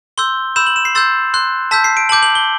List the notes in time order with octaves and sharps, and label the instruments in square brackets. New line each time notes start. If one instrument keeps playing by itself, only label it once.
[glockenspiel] C6 E6 G6 G7
B5 E6 G6 E7
F#7
E7
C7
C6 E6 G6 A6
C6 F#6
A5 E6 G6 B6
C7
D7
A5 D6 G6 F#7
F#7
G7